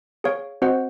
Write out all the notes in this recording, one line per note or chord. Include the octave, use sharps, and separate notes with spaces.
G#4 C#5 F5
C4 F#4 C5 D#5 F#5